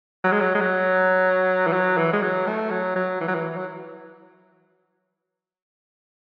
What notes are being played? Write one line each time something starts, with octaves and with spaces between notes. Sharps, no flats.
F#3
G#3
F#3
G#3
F#3
E3
F#3
E3
G#3
F#3
A3
F#3
F#3
E3
F#3
E3
F#3